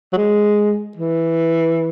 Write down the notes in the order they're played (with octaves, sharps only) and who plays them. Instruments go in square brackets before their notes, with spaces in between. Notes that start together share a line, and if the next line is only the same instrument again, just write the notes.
[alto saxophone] F#3
G#3
E3